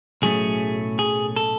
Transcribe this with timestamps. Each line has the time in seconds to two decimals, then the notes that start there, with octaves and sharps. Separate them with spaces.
0.22 B1 A2 F#3 A3 C#4 G#4
0.99 G#4
1.36 A4